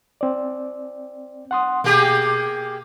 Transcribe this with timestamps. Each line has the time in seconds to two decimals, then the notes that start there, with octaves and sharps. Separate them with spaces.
0.21 C4 D5
1.51 F#5 C6 D#6
1.84 B2 A#3 G4 G#4